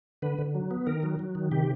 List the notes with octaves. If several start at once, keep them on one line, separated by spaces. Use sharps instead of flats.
D3 B4
D3
F#3
B3
D#3 A#4
F#3
F#3
D#3
C3 G4